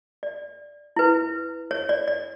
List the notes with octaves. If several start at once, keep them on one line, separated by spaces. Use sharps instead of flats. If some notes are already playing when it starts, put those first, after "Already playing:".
D5
E4 B4
C#5
D5
D5